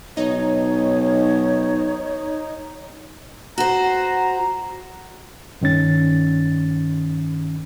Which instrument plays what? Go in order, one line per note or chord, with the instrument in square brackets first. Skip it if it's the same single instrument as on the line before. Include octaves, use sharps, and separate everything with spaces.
[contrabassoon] B1 [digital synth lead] D#4 [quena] C#5
[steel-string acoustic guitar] F#4 C5 [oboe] A#5
[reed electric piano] G2 D#3 C#4 A6